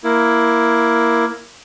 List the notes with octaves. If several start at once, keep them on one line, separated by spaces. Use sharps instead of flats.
A#3 E4